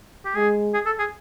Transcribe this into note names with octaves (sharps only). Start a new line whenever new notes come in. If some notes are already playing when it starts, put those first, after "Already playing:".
G4
G#3 G#4
G#4
A4
G#4